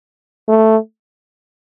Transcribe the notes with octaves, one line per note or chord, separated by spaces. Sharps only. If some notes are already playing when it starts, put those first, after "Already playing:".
A3